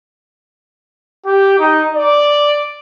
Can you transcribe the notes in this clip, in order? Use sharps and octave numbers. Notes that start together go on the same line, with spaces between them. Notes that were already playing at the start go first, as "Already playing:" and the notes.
G4
D#4
D5